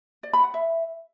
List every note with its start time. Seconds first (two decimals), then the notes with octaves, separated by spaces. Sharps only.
0.23 D5
0.33 B5
0.44 F#5
0.54 E5